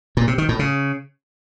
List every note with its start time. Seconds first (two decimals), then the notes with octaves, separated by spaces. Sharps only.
0.17 A#2
0.27 C3
0.38 D#3
0.49 A2
0.59 C#3